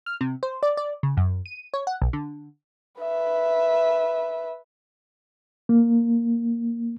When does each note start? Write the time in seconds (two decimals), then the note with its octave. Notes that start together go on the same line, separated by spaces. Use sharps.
0.06 F6
0.21 C3
0.43 C5
0.63 D5
0.77 D5
1.03 C#3
1.17 F#2
1.46 D#7
1.74 C#5
1.87 F#5
2.02 B1
2.13 D3
3.02 B4 E5
5.69 A#3